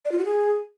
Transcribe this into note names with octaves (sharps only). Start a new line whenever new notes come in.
D5
F4
F#4
G#4